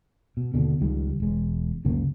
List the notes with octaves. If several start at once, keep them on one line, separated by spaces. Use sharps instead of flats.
B2
D#2 B2 D3
C#2 D#3 G3
E1 G#3
C#2 F#2 C#3 A#3